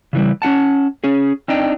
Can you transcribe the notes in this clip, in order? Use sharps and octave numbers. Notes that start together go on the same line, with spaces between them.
C#3 E3 G3
C#4 E4 F#5 A5
C#4 G#4
C4 D4 D#4 G5